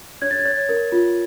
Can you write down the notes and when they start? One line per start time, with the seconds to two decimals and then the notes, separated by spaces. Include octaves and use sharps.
0.22 C#5 G#6
0.31 A6
0.39 G#6
0.45 C#5
0.69 A#4
0.92 F4